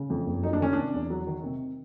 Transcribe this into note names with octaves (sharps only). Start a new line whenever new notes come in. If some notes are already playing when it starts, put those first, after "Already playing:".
Already playing: C#3
F2
F#1
F#3 D#4
D4
D#3 C#4
C3 D4
E2
F#3
D#3
C3